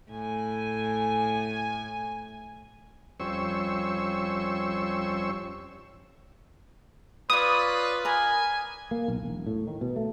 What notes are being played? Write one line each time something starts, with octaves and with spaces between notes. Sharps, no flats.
A2 G#5
F2 G3 C#4 C5 C#6 E6
F4 B4 C#5 D5 D#6
A#4 G#5 B5
A#3
B1
E1
A2
D#3
B2
A3